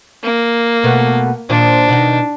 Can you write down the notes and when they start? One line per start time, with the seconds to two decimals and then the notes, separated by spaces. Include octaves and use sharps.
0.24 A#3
0.84 B2 A3 B3
1.50 A#2 D#3 F3 D4
1.89 B2 D#3 D#4